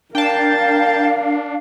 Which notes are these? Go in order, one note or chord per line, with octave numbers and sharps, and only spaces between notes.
D4 A#4 F5 G5 A5